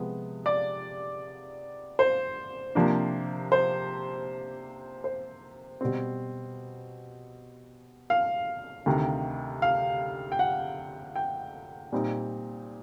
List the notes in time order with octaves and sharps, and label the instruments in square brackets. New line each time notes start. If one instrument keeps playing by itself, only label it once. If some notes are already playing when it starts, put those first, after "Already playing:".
Already playing: [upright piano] C3 F3 G#3 B3
D5
C5
C3 F3 A#3 D4
C5
C5
B2 G3 C4
F5
D2 C3 D#3
F5
G5
F#5
G5
A#2 G3 C4 D#4